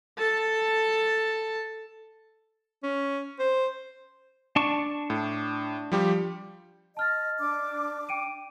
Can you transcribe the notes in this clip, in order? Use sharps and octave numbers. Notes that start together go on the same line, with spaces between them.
A4 A5
C#4
C5
D4 A5 C#6
A2
F3 G3 G4
D#5 A5 F6 A6
D4 D6
G5 D7 D#7